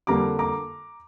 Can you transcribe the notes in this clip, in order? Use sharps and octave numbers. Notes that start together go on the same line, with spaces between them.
F2 D3 G3 A#3 A#5 D6
A#5 D6